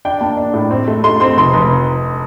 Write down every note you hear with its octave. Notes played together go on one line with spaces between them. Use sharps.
D4 G5
A#3 A5
D4
A2
C4
A3
A3 C6
C4 C6
F1 C6
F1